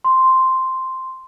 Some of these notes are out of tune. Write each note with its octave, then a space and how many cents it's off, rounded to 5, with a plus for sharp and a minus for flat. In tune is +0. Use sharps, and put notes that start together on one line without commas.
C6 +0